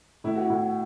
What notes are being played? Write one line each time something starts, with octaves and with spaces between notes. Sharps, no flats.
A2 E4
F#4
A2 E4